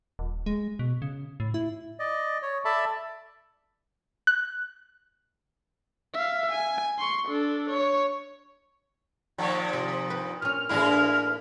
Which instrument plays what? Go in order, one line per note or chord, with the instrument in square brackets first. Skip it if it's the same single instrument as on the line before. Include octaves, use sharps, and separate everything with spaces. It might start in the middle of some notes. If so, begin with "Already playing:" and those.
[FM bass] D#1
G#3
B2
C#3
A2
E4
[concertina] D5 D#5
C#5
A4 D5 E5 A5 B5
[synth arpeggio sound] F#6
[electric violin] E5 F5
G#5
C6 C#6
D4 A4
C#5
[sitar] A#2 D#3 F3
[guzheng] C3
B4 G5
[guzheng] A#2 C#4 [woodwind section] F6
[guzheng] A2 A#3 D4 [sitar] E3 G#3 E4